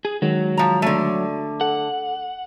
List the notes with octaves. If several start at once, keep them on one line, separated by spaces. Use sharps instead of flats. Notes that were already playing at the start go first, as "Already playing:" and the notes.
G#4
D#3 F#3 G#3
F3 A#5
D3 A3
A4 F#5